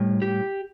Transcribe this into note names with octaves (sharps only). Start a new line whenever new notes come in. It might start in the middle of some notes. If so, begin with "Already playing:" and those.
Already playing: A2 G3
G4